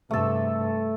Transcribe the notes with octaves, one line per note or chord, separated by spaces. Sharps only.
G2 C3 A3 A4